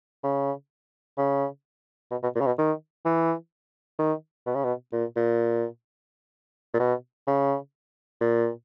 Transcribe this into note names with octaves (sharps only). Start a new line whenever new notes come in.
C#3
C#3
B2
B2
A#2
C#3
B2
D#3
E3
D#3
B2
C#3
B2
A#2
A#2
A#2
B2
C#3
A#2